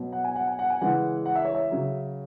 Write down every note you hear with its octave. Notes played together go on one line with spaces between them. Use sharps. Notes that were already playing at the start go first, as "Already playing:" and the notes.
Already playing: B2 F#3
F#5
G#5
F#5
G#5
F#5
G#5
C#3 E3 G#3 F#5
F#5
E5
C#5
E5
C#3 F#3